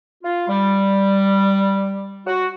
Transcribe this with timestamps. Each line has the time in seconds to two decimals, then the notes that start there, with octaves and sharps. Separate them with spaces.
0.23 F4
0.48 G3
2.26 F#4